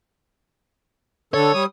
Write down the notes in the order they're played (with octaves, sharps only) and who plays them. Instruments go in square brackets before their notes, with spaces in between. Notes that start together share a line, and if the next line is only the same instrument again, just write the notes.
[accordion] D3 A4 [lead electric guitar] C#5
[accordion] G3 D#6